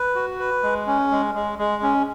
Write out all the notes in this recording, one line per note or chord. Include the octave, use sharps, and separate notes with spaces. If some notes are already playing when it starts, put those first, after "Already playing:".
Already playing: B4
F#4
B4
G#3
C#4
G#3
G#3
G#3
C#4